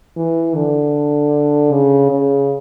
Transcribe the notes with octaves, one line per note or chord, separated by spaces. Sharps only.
E3
D3
C#3
C#3